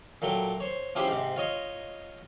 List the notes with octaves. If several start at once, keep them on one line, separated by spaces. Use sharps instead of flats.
A#2 F#3 A3 G5
C5 C#5
F3 C#4 E4 G4 G#4 C5
G#2 C3
F4 C#5 D#5